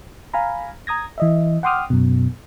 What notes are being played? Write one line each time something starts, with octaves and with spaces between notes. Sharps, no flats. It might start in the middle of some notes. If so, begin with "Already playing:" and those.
F5 G#5 A#5 B5
A#5 D#6 G#6 A#6
E3 D#5 E5
F#5 G5 C6 D6 D#6 F6
F#2 B2